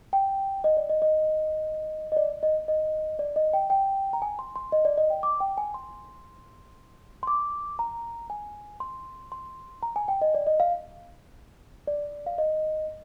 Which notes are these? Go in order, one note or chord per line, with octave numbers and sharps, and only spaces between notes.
G5
D#5
D5
D#5
D#5
D#5
D5
D#5
D#5
D5
D#5
G5
G5
A#5
G#5
C6
C6
D#5
D5
D#5
G5
D6
G5
G#5
C6
C6
D6
A#5
G#5
C6
C6
A#5
G#5
G5
D#5
D5
D#5
F5
D5
F5
D#5